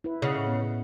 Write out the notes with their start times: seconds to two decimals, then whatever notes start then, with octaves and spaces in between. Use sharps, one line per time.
0.04 E4 B4
0.22 C#3 D#5 F#5
0.35 A2
0.47 B3